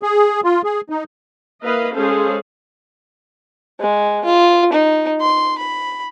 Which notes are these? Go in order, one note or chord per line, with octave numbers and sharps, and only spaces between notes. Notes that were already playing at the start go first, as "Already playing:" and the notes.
G#4
F4
G#4
D#4
A#3 E4 A#4 B4 D#5 F5
G#3 C#4 G#4 A4 C5 F5
G#3
F4
D#4
C6
B5